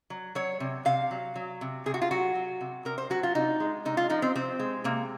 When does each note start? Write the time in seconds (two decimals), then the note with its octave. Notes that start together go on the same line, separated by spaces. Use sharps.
0.10 F#3
0.35 F#3 C#5
0.60 C3
0.85 C3 F5
1.11 F#3
1.36 F#3
1.61 C3
1.86 C3 G#4
1.94 F#4
2.02 F4
2.11 F#3 F#4
2.35 F#3
2.61 C3
2.85 C3 A#4
2.98 C5
3.10 F#3 F#4
3.23 F4
3.35 C3 D#4
3.60 G#3
3.85 C3 D#4
3.97 F4
4.10 F3 D#4
4.22 C4
4.35 C3 C4
4.59 G#3
4.84 C3 A#3